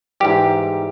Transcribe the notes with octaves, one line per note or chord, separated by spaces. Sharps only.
G#2 E3 G3 G4